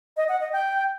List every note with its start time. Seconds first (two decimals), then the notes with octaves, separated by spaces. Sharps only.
0.17 D#5
0.29 F#5
0.41 D#5
0.52 G5